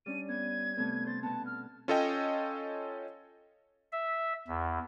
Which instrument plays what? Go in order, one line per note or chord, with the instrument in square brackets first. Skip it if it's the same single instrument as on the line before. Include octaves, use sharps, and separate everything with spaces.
[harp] G3 C#4 D4 [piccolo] D#7
[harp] B3 [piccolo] G#6
[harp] C3 A3 B3
[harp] C5 [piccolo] A6
[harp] B2 B3 [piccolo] A5
[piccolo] F6
[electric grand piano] C#4 F4 A4 C#5 D#5 G5
[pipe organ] E5
E2